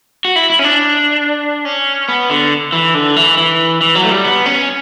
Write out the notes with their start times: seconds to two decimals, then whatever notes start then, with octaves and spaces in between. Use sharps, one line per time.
0.25 F#4
0.36 E4
0.50 E4
0.59 C#4
0.64 D4
1.65 C#4
2.08 B3
2.30 D3
2.72 E3
2.94 D3
3.16 E3
3.38 E3
3.81 E3
3.95 F#3
4.03 A3
4.10 G3
4.24 B3
4.46 C#4